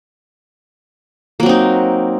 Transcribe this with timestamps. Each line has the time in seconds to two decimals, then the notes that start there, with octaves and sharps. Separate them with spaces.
1.40 A#3
1.43 F#3
1.46 C4
1.49 D#4